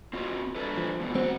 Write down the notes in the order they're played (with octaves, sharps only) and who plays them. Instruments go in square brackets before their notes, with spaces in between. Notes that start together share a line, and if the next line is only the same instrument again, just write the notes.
[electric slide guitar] C4 F4 F#4
D4 A4 B4
[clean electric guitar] F3
[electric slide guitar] G#2 B2
[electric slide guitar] G#2 F#4 [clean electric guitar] C4